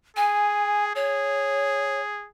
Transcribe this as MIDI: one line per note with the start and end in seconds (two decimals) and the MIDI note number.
0.17 0.95 68
0.17 0.85 80
0.95 2.28 68
0.95 2.01 73